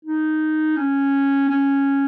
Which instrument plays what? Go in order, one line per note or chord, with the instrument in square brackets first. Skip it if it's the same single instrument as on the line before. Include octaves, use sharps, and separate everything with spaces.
[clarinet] D#4
C#4
C#4